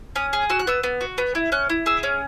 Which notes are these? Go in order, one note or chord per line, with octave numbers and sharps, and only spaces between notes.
C#4 D#6
G#4
F#4 E6
F#6
B3 E6
B3
F#4
B3
E4
C#4 F#6
E4
G#4 E6
C#4